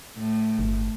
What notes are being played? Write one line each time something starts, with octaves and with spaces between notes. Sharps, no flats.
A2
G1